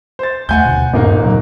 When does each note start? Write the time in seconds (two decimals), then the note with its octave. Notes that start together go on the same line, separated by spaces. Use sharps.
0.19 C5 A6
0.49 D#2 A3 F#5 G#5 G6
0.65 D#1 D2 B2
0.93 D#1 G2 A#3 B3 D#4
1.23 A#2 C#3 F#3